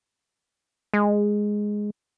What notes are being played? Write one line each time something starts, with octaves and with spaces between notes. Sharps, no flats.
G#3